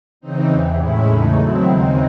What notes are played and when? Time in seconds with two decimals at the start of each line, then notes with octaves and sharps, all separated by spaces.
0.20 C#3 E3 C4 D#4
0.49 E2 C3 E3
0.78 A2 G#3 C#4 E4
1.06 E2 C#3 E3 A3 D#4
1.35 D#3 F#3 C4 E4
1.64 D#2 C#3 G#3 C4 D#4